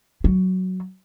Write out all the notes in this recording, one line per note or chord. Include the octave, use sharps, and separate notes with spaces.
F#3